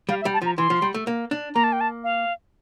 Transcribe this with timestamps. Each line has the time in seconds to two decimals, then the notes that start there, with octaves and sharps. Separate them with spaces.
0.09 G3 F5
0.21 E5
0.25 G3
0.34 A5
0.42 F3 A#5
0.57 E3 C6
0.70 F3
0.82 G3
0.94 A3
1.07 A#3
1.31 D4
1.55 A#3 A#5
1.64 A5
1.72 G5
1.81 A5
2.04 F5